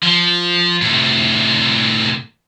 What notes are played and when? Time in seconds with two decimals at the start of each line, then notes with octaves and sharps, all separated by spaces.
0.03 F3
0.81 A2 C3